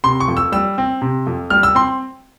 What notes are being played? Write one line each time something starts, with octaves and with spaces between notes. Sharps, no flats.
C3 C6
C#6
F2
E6
G3 E6
C4
C3
F2
G3 F6
E6
C4 C6